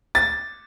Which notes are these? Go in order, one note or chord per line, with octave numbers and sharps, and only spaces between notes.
A6